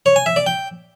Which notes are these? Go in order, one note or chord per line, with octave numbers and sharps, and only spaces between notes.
C#5
G#5
E5
D5
G5